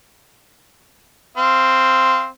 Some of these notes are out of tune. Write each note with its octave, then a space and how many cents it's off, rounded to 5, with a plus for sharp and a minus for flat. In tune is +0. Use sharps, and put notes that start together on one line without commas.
C4 +0 F5 -25